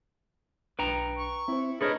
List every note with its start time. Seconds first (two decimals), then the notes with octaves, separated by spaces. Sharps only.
0.79 B1 D4 B4 G5 A#5
1.18 C#6
1.48 C4 E4 C5
1.81 A3 D4 G#4 A#4 B4 C#5 D#5